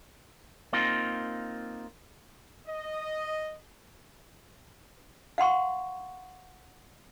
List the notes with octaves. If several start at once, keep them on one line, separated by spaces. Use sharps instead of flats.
A#3 C4 D#4 F4
D#5
F5 F#5 C6 C#6